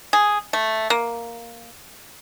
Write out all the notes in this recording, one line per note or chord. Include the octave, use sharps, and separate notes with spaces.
G#4
A3
A#3